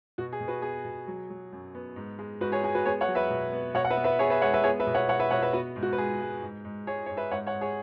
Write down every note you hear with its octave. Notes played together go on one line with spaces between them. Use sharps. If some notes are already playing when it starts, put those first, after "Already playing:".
B2 F#4
G#4
B2
F#4 B4
B3 G#4
B2
F#3
F#3
F#2
B3
G#2
G#3
G#2 F#4 B4
G#4 C#5
G#3 G#4
F#4 B4
B3 G#4 C#5
C#5 F#5
F#3
B4 E5
B2
B3
B2 C#5 F#5
F#5
B4 E5
B3
B4 E5
B3 G#4 C#5
B4 E5
G#3 C#5 F#5
B4 E5
B3 G#4 C#5
B4 E5
B2
C#5 F#5
B2 C#5 F#5
B4 E5
B2 C#5 F#5
B4 E5
B3 F#4 B4
G#2
F#4
B4
G#3 G#4
G#3
G#2
G#2
G#3 G#4 C#5
G#2 C#5
B4 E5
G#2 C#5 F#5
C#5 F#5
G#2
G#4 C#5